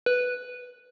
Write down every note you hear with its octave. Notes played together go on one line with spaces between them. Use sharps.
B4